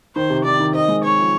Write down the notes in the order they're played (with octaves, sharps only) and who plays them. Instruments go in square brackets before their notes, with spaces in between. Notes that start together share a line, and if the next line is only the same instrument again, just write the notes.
[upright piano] D#3 [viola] C5
[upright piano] C3
[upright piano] D#3 [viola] D5
[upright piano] D#3
[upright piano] C4 [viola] D#5
[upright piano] G#3
[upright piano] C4 [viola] C#5
[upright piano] F3